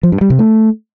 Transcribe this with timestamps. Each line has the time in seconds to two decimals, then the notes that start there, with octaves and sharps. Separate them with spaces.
0.03 F3
0.12 G2
0.21 G3
0.30 C3
0.39 A3